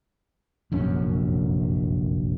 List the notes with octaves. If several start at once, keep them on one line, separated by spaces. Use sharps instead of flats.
F1 A#1 F#2 C#4